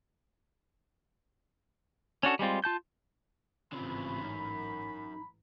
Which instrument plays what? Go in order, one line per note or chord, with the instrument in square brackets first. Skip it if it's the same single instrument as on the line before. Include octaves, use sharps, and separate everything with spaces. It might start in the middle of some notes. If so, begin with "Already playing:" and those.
[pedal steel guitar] C#4 D4 F#4 A4
G3 G#3 C4 F4
F4 A5 G6
[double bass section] A1 G#2 E3 [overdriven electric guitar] C#3 C4 [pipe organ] F4 [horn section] B5
[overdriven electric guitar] F#2 [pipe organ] D#4